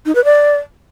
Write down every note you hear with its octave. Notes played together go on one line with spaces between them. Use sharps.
D#4
B4
D5